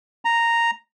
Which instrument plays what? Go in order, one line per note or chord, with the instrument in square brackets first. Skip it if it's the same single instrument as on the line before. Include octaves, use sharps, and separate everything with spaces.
[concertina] A#5